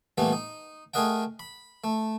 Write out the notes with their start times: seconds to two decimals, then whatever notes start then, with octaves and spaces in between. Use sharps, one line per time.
0.18 A#2 E3 G3 A3 B3
0.33 D#4
0.94 A3 G#4 A#4 D#5 F#5 G5
1.39 B5
1.84 A3